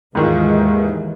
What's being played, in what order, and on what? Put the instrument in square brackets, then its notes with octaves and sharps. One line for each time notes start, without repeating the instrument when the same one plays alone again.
[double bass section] D#2 E3 G#3 [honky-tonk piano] G#2 D#3 F4